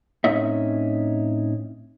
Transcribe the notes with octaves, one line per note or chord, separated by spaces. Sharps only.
A2 C4 C#4 D#4 E5